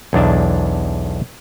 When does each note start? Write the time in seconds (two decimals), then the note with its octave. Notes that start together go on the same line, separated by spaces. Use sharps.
0.13 B1 E2 D4 A5